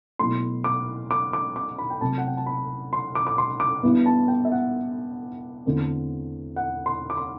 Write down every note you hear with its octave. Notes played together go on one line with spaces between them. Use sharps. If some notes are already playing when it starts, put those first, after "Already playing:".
B2 F#3 A3 E4 C6
D6
D6
D6
D6
B5
G5
C3 F#3 A3 C4 A5
F#5
G5
A5
B5
C6
D6
D6
C6
D6
G2 E3 B3 E4
A5
G5
E5
F#5
E2 D3 A3 C4
F#5
C6
D6
C6